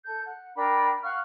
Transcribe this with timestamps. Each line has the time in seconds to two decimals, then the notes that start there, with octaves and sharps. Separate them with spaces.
0.04 A4 G6
0.27 F#5
0.56 D4 A#4 G5 B5
1.03 F5 F#5 C#6 F6